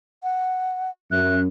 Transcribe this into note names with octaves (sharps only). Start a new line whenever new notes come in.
F#5
F#2 E5 F#6